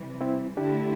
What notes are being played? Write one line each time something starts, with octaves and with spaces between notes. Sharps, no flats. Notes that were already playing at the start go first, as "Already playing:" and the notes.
Already playing: C3 E3 G3
C4 E4
D3 A3 D4 E4 G4